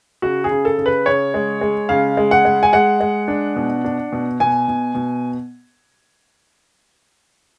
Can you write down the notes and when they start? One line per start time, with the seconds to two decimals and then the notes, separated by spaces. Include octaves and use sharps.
0.22 C#3 F#4
0.44 G#4
0.51 C#3
0.65 A4
0.78 C#3
0.86 B4
1.06 C#3 C#5
1.34 G#3
1.61 G#3
1.89 C#3 F5
2.17 G#3
2.31 F#5
2.45 G#3
2.63 G#5
2.73 G#3 F#5
3.00 G#3
3.28 D4
3.56 B2
3.85 D4
4.12 B2
4.40 B2 G#5
4.68 B2
4.95 B2